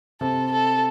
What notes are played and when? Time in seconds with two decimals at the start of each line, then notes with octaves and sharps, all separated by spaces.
0.21 C3 C4 A4
0.52 A4